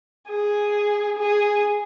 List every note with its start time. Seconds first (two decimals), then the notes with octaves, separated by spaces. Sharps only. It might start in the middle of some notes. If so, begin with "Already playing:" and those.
0.29 G#4
1.19 G#4